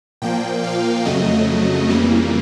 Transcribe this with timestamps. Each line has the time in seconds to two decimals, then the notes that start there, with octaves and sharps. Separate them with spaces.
0.22 A#2 F3 A#3 G5
0.64 F5
1.05 F2 C#3 F#3 A3 D#5
1.89 F2 C#3 E3 G3 A#3